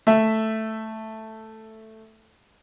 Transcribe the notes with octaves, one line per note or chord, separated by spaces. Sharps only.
A3 E5